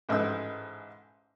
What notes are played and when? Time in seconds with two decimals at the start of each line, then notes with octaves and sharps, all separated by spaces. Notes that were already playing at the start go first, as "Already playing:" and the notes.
0.09 A1 G#2 B4 E6